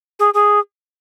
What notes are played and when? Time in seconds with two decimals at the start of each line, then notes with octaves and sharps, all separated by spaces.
0.19 G#4
0.34 G#4